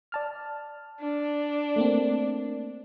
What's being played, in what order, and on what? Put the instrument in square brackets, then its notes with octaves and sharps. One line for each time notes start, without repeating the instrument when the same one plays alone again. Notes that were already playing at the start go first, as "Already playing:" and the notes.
[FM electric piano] D5 A5 F6
[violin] D4
[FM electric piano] A3 A#3 C4